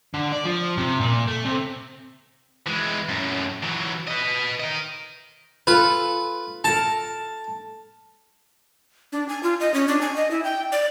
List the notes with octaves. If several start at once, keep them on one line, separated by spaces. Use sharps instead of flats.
D3
D5
F3
C3
A#2
A3
C3
E3 G#3
F#2 A2
E3 F#3
B4 D#5
A#4 D#5
F4 A4 B4 G#5
A4 A#4 A5
D4
G#5
F4
D#5
C#4
D4
G#5
D#5
E4
G5
D5